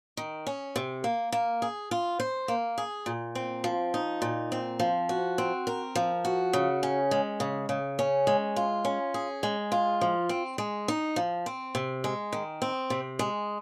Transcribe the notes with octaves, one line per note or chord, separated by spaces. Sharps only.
D#3
C#4
C3
A#3
A#3
G#4
F4
C5
A#3
G#4
A#2
C4
F3
D#4
A#2
C4
F3
F#4
C4
A#4
F3
F#4
C#3
C#4
G#3
C#3
C#3
C#4
G#3
F4
C#4
G#4
G#3
F4
F3
C4
G#3
D#4
F3
C4
C3
G#3
D#3
C4
C3
G#3